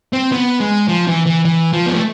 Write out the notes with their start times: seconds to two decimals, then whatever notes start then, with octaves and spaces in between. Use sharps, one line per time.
0.13 C4
0.32 B3
0.60 G#3
0.88 F3
1.07 E3
1.26 E3
1.45 E3
1.73 F3
1.86 B3
1.94 A3